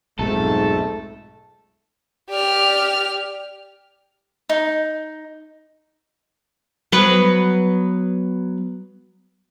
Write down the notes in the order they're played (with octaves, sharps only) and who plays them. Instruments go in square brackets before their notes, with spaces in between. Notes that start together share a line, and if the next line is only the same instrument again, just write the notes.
[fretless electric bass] B1 [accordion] F2 G#2 A3 [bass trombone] G#3 [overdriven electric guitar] A4
[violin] G4 F6 [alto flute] D5
[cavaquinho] D#4
[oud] F#3 B3 B4